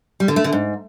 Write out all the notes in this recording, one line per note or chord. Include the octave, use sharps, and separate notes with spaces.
G3
D3
A3
D3
G#2